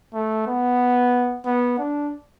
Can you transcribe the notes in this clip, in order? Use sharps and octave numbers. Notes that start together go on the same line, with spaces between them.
A3
B3
B3
D4